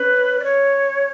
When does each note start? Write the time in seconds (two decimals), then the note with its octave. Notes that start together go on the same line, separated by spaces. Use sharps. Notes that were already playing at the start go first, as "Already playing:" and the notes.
Already playing: C#4 B4
0.40 D5
0.44 C#5